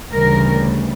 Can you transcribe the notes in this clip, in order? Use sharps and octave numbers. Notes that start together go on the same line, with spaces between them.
D2 C#3 E3 G3 A#4